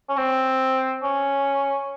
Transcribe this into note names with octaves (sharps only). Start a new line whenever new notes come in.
C#4
C4
C#4